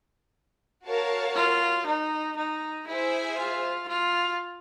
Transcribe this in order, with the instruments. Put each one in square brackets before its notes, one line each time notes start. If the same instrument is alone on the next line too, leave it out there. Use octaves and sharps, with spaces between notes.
[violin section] F#4 A#4 C#5 F5 A5
[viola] F4
D#4
D#4
[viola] E4 [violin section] G#4 C5 E5 G#5
[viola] F4
F4